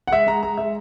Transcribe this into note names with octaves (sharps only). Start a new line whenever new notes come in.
F#5
G#3 E5
G#3 A#5
G#3 A#5
G#3 E5